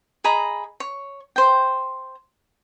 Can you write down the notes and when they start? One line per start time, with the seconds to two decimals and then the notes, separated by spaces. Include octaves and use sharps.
0.24 G#4 D#5 A#5 B5
0.80 C#5
1.36 C5 G5